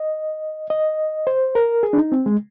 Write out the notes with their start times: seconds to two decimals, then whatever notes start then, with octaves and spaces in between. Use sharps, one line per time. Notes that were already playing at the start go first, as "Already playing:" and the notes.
Already playing: D#5
0.70 D#5
1.27 C5
1.55 A#4
1.83 G#4
1.93 D4
1.98 D#4
2.12 C4
2.26 G#3